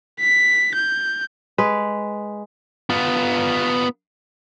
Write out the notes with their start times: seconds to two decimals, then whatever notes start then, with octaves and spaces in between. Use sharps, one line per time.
0.21 B6
0.75 G6
1.58 G#3 B4
2.90 B3 F4